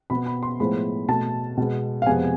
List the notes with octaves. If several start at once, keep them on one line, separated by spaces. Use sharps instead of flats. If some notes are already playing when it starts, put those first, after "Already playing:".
B2 B3 B5
B5
C6
A2 F3 G#3 B3 B5
B2 A3 A5
B2 G#3 B3
F5
F2 C3 G#3 B3 G#5